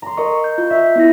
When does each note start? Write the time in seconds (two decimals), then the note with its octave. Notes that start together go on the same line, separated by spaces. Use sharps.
0.02 A#5 C6
0.17 A#4 D#5 C#6
0.44 G6
0.58 F4 G6
0.70 E5
0.96 B3 E4 A#6